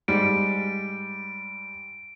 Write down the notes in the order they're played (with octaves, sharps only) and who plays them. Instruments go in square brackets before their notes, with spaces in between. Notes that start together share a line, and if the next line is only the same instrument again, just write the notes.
[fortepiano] G#2 G3 [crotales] D7